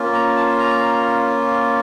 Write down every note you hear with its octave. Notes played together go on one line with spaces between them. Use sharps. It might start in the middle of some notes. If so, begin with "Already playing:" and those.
Already playing: A#3 C#4 F4
A#5
A5
A#5